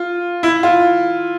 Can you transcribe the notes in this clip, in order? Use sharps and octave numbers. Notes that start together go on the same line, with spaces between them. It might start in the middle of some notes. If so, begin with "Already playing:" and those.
Already playing: F4
E4
F4